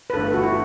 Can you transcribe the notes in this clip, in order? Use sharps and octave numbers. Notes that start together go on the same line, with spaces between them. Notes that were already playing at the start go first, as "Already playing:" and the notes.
B4
G1 G2 E3 A3 A4
F#4
E4